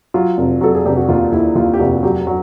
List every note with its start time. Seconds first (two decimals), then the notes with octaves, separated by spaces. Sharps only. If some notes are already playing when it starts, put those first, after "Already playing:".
0.14 F#3 F4
0.38 F1
0.61 F#3 A4
0.75 G#4
0.85 F1 G4
0.97 F#4
1.09 D#2 F4
1.32 D#2 E4
1.55 D#2 F4
1.74 G4
1.79 F1 F#4
2.03 F#3 G4
2.27 F#3